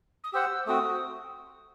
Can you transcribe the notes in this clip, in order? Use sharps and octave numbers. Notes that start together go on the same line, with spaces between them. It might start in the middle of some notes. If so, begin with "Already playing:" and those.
D#6
G4 C5 F#5 E6
A3 C4 F#4 D#6